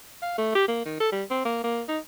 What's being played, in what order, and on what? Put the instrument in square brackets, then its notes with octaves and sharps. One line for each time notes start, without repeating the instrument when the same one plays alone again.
[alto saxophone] F5
A3
G4
A#3
D#3
A4
G3
C4
A#3
A#3
D#4